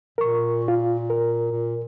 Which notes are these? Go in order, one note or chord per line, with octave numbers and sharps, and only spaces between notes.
A#2 A#4 C#6
F4
A#4
A#2